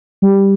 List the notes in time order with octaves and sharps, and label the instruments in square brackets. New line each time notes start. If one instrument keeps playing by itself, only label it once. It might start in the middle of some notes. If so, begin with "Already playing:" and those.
[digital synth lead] G3